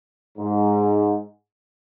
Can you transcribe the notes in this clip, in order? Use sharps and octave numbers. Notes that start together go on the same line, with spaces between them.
G#2